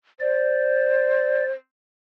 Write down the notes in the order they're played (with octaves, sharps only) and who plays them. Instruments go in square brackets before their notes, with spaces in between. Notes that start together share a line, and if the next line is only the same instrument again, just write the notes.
[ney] C5 [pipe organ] D5